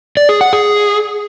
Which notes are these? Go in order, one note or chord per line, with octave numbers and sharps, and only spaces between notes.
D5
G#4
F#5
G#4